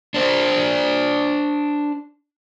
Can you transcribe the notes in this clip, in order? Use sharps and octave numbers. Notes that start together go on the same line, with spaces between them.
D4 C5 D5